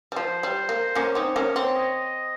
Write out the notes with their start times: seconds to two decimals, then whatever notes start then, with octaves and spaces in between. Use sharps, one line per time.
0.12 G3
0.16 F3 C5
0.43 G3
0.69 A#3
0.95 A#3 C#4 C#5
1.15 C4 D#4
1.36 A#3 C#4
1.56 C4
1.75 D#5